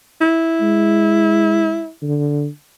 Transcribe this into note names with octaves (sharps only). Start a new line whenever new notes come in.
E4
G#3
D3